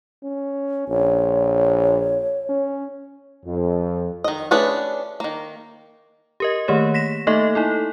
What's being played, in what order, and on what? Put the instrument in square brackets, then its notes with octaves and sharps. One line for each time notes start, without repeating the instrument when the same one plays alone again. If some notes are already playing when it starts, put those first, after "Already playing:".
[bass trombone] C#4
[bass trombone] A#1 [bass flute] C#5
[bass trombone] C#4
[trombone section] F2
[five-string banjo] D#3 D#5
A3 C#4 D4 G#4 B4
D#3 A#3
[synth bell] G4 A#4 D#5
D#3 A3 A#3 G4 C#5
A#6 B6 E7
A3 A#3 D#4 A4 D#5 E5
D#4 E4 A4